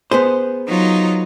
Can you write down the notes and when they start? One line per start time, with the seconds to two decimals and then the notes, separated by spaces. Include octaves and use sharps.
0.11 B3 G#4 C5
0.67 F#3 D#4 F4